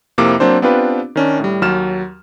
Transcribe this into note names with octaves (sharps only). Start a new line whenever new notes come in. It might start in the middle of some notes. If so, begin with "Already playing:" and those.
F2 C3 A#3 E4 D6
F#3 A#3 C4 D4 C5
B3 C4 D4 F4 G4 B4
D#3 C#4 D4
A2 G3
D#2 F#3 F6 E7